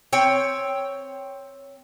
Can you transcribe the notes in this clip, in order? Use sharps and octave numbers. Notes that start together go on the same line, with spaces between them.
C4 C#5 G5